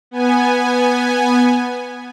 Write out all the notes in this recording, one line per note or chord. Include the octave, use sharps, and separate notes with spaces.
B3 G#5